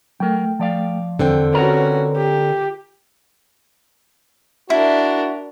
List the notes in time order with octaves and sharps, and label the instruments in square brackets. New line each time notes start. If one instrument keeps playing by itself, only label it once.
[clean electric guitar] F#3 A#4 [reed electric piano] A3 G5
[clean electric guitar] F3 D5 F5
[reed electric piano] E2 [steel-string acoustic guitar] D3 C4 G5
[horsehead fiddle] C#4 F#4 [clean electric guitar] F4 A#4 A#5 [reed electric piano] B4 C#5
[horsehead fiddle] G4
[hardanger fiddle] D4 A#4 [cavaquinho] E4 [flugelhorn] F#4